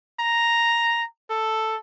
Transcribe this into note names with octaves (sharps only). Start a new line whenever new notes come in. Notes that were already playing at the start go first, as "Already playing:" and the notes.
A#5
A4